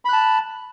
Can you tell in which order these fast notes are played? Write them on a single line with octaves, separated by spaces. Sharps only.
B5 F#6 A5